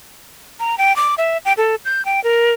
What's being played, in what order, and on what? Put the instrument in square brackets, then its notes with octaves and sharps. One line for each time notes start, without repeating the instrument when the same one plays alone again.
[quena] A#5
G5
D6
E5
G5
A4
G6
G5
A#4